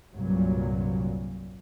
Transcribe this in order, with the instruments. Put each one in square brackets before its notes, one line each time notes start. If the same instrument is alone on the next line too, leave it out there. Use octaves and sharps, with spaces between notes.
[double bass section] C2 G2 A#2 F#3